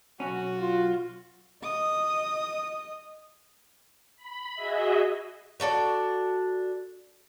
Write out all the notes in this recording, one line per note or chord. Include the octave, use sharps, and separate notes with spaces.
B1 C#4 F#4
F4
D#5 D#6
B5
F#4 G#4 D#5 E5
D4 F#4 A4 D5